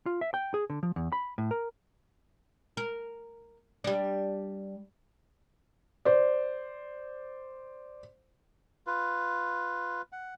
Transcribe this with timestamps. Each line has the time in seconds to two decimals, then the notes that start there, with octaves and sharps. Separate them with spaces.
0.06 F4
0.21 E5
0.34 G5
0.54 G#4
0.70 D3
0.83 F3
0.96 E2
1.12 B5
1.38 A2
1.51 A#4
2.77 A#4
3.84 G3 D4
6.05 C5 D5
8.87 F4 B4
10.12 F#5